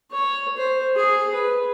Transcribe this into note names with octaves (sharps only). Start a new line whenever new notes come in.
C#5
C5
G#4
B4